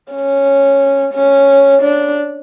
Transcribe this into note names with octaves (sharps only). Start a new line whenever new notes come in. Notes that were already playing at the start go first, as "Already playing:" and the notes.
C#4
C#4
D4